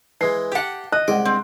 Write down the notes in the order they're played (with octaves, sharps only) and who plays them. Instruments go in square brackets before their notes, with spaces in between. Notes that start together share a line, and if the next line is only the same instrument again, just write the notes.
[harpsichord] E3 G#3 [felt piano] C7
[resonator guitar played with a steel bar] G4 F#5 [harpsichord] G5 A5
[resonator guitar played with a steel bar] D#5 [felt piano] F#6
[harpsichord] C2 C6 D6 [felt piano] G#3 F#5
[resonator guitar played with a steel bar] C4